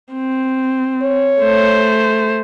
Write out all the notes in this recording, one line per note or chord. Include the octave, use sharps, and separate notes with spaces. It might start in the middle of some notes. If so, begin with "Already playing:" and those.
C4
C#5
A3 C5